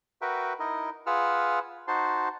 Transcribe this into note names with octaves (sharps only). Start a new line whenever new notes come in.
F#4 A#4 B4 E5 G5
D#4 E4 A#4 D#5
F4 G#4 B4 F#5 E6 F6
D#4 F#4 C5 A5 C6